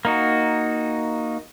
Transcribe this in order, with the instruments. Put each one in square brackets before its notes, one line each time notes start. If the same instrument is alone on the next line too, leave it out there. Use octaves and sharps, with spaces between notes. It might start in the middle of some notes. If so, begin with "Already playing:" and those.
[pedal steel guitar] A#3 D#4 F#4